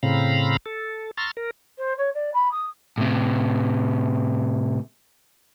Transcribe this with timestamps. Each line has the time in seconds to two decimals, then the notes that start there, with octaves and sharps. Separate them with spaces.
0.03 A2 C#3 C4 F5 A#5 B5
0.66 A4
1.17 A#5 C6 C#6 E6 F6 A6
1.37 A#4
1.78 C5
1.98 C#5
2.14 D5
2.34 B5
2.51 D#6
2.98 A2 C3